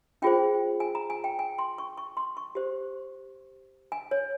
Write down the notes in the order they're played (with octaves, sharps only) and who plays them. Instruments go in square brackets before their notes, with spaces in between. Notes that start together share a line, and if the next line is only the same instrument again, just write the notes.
[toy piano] C#4 F4 G#4 C5 G5
G#5
A#5
G#5
G5
G#5
C6
C#6
C#6
C6
C#6
G4 C5
G#5
C#5